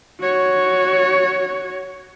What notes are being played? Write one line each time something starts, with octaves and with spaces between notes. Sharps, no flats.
F#4 C#5